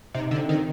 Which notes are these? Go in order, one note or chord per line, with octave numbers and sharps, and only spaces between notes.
C3 D#4
D3
C4
D#3